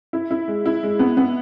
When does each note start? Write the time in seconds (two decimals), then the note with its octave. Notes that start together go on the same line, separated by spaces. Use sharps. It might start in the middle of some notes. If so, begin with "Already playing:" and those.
0.13 E4
0.31 E4
0.48 G#3
0.66 E4
0.83 G#3
0.99 B3
1.17 B3